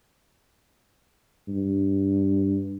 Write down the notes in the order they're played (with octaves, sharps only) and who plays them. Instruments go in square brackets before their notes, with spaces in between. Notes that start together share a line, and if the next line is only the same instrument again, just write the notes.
[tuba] G2